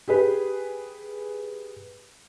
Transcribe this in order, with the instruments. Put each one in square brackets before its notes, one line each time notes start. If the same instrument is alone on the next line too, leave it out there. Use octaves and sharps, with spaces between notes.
[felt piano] G4 G#4 B4